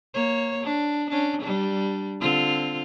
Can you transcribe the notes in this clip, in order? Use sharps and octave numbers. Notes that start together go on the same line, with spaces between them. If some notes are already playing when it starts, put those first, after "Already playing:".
A#3 C#5
D4
C#4 D4
G3 D4
D3 C4 F4